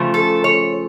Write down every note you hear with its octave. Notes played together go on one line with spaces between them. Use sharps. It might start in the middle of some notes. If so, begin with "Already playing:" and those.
Already playing: C#3 F3 A3
A4
C#5